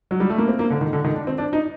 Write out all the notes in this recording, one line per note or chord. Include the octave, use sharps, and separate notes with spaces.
F#3
G3
A3
A#3
C4
A#3
D3
D#3
D3
D#3
D4
C4
D4
D#4